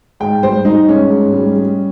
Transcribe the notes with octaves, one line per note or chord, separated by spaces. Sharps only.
G#2 G5
G3 C5
G3 D#4
G#2 C#4
G#2
G3
G3